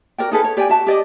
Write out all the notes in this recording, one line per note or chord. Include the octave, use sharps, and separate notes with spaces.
F#4 A#4 D5 G5
D#4 G#4 A4 B4
C#5
G4 D5 G5 G#5
F#4 E5 A5
G4 D5 D#5